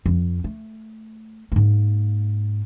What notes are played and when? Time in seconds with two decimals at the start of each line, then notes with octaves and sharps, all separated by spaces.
0.06 F2
0.44 A3
1.52 G#2 A#3